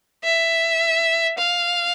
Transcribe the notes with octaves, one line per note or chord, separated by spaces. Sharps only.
E5
F5